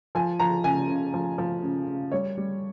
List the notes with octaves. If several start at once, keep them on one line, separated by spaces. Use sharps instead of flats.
F3 G#5
F3 A#5
C#3 G#5
C#3
F3
F3
C#3
C#3
G3 C#5
G3